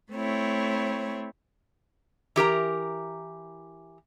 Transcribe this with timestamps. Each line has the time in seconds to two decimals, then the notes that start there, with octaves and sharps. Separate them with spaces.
0.12 A3 C4 E4 C#5
2.36 E3 G4 A#4 A#5